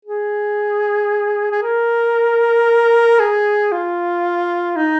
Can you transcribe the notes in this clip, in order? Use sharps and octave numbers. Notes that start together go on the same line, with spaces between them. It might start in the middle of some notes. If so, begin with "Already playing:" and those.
G#4
G#4
A#4
G#4
F4
D#4